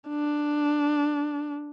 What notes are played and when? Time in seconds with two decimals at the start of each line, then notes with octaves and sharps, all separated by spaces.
0.09 D4